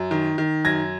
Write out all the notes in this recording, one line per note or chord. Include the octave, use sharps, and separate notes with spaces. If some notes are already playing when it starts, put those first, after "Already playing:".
Already playing: F#2
D#3
D#3
F#2 G#6 A#6